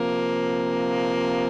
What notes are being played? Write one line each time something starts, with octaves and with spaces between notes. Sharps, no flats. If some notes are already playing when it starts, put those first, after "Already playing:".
Already playing: C3 F3 A#3